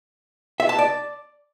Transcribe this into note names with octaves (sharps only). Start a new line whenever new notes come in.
E5
A5
D5